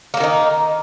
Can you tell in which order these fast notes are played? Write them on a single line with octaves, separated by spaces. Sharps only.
A#3 F#3 D#3 D#4